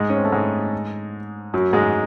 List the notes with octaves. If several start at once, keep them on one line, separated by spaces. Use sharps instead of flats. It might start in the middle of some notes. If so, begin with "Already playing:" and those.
Already playing: G#2 G#3
C#4
C4
A3
G#2 G#3
F#2 F#3
G#2 G#3